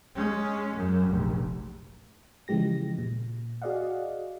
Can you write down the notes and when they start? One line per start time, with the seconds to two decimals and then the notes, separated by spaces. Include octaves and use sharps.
0.15 G#3 C#4
0.76 F#2
1.08 F1 A#1
2.48 C#3 E3 F3 G#3 G4 A#6
2.99 A#2
3.62 F#4 G#4 D5 D#5 F5 F#5